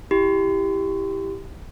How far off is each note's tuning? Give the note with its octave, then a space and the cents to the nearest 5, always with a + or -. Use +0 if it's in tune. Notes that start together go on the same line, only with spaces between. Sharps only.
E4 +0 G4 +0 C6 -40